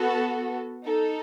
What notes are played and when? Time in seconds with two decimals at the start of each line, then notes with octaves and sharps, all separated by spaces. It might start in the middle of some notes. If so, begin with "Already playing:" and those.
Already playing: B3 F#4 A4
0.09 A5
0.85 D#4 A4